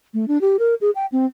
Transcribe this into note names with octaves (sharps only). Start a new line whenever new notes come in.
A3
D4
G4
A#4
G#4
G5
C4